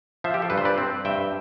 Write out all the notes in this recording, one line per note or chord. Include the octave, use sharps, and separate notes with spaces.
F3 C5 E5
G4
A4
G2 B4
C5
B4 D5
C4
G2 E5 G5